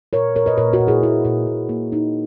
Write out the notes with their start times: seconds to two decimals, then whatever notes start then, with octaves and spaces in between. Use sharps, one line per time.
0.13 A#2 A#4 C#5
0.36 A#2 A#4 C#5
0.46 B4 D#5
0.57 A#2 A#4 C#5
0.73 F#4 A#4
0.80 A#2
0.87 E4 G#4
1.03 A#2 E4
1.25 A#2 E4
1.47 A#2
1.69 A#3
1.92 D#4